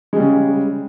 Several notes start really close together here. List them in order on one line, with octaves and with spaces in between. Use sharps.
G#3 G3 C#3